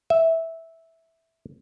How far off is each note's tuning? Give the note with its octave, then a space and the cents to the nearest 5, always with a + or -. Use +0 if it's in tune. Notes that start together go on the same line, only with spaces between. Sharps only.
E5 -10